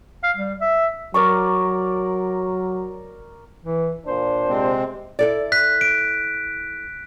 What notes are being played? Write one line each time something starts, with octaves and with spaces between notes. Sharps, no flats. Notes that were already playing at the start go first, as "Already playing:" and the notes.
F5
G3
E5
F#3 A#4 D5 C#6
E3
A#2 D4 C5
C3 G#3 C4
E4 A4 D5
F#6 B6
D7